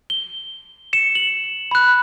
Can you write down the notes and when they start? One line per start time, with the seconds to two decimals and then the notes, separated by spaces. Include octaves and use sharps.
0.10 G7
0.93 C#7 E7
1.15 F#7
1.71 B5 F#6